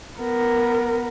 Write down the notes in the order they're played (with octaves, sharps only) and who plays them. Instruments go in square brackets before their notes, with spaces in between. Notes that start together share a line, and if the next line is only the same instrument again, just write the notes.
[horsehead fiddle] B3 A#4